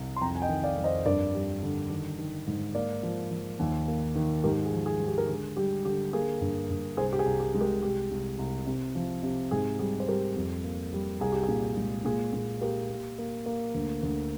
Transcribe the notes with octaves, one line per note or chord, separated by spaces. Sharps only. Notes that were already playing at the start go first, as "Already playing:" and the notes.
Already playing: C2
C6
F2 G5 A#5
G#5
D#5 G5
D#3
D5 F5
F2
C5 D#5
G2 A#4 D5
G3
D3
D#3
D#3
G#2
A#3 D5 F5
F3
F3
D#2
A#3
D#3
G#2 G4 A#4
G#4
F3
G#4
G#3
G4
A#4
D3 G#4
G3 G4
D3 G4
A#3 G#4
G2
G2
C2 G#4 C5
G4
G#4
C2
G4
G#3
G4 A#4
C2 G4
C2
C2
C3
F3
C3
G#2 G#4
G3 G#4
C5
G3 G4 A#4
F2
A#3
G3
C2 G#4
G4
A#2 G#4
G#3
A#2 G#4
A#2 G#4
A#3 G4 A#4
A#3
A#3
A#3
D2
D2